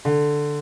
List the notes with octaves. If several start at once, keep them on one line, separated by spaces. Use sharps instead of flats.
D3